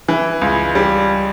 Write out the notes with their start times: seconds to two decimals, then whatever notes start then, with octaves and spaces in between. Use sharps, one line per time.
0.08 E3
0.41 C#2
0.75 G3